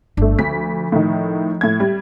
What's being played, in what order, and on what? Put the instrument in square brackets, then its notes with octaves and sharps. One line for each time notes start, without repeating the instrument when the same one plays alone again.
[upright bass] G1 [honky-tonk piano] A3 D4
[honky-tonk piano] D2 B6 [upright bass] F3
[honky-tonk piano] A2 D#3
A2 G#6
G3